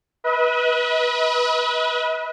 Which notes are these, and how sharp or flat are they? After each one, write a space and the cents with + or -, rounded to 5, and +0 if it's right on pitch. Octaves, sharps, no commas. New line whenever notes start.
B4 -20 D#5 +45